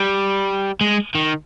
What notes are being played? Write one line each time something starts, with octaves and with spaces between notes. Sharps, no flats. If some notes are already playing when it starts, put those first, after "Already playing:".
Already playing: G3
G#3
D#3